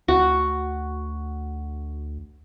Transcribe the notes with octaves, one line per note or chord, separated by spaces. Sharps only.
D2 F#4